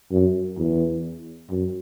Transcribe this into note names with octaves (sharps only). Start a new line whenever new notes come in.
F#2
E2
F#2